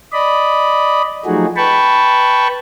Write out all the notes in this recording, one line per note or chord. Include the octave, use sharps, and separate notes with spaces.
D5 D#5 B5
F3 F#3 A3 D#4 F#4 G#4
B4 G5 A5 B5 C#6